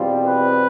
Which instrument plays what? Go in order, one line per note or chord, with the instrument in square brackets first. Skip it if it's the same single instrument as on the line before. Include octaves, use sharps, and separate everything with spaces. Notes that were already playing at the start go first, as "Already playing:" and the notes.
Already playing: [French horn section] E2 B2 G3 C4 F4
[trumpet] B4